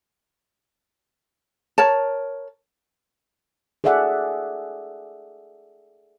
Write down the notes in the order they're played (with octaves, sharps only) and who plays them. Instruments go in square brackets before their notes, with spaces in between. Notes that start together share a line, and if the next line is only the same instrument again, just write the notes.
[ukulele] A#4 C#5 A5
[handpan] G#4 A4 D5 E5 F#5